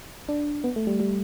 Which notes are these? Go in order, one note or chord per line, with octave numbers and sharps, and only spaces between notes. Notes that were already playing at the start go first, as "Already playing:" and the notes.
D4
B3
A3
G3
G3